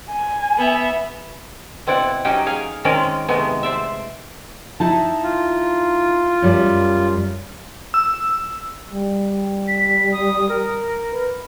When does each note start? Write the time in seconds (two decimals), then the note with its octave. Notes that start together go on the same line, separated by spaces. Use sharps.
0.11 G#5
0.58 B3 E5
1.87 B2 C4 E4 D5 F#5
2.25 F#3 C#4 D#4 G4 G5
2.46 G#4 C#5 F5
2.85 D#3 G#3 C4 C#4 A#4 D5
3.28 C3 D#3 G#3 A3 B3
3.63 C5 D5 E5
4.80 D#4 E4 A5
5.23 F4
6.42 F#2 G3
7.94 E6
8.91 G3
9.68 B6
10.13 D#6
10.49 A#4
11.13 B4